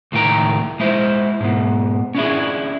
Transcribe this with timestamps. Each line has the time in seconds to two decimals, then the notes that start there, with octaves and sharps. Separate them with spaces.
0.12 C#2 A2 D#3 G5 A#5
0.80 G#3 E4 C5
1.41 G#2 B2
2.15 C#4 D4 E4 G#4